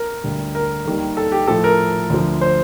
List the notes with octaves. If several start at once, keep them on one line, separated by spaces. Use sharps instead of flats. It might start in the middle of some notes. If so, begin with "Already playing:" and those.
Already playing: A#4
D2 D3 G3
A#4
D#2 D#3 G3
A4
G4
A2 F3 A4
A#4
D2 D3 F3
C5